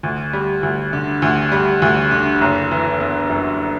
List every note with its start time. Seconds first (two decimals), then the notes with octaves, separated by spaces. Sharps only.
0.03 D2
0.33 G3
0.63 D2
0.93 D3
1.22 D2
1.52 G3
1.82 D2
2.11 D3
2.41 F#1
2.71 E3
3.00 B3
3.30 F#2